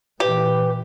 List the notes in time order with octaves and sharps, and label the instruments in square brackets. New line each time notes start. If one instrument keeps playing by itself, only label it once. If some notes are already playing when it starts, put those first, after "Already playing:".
[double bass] A#2 E3 [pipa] G4 [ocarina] B4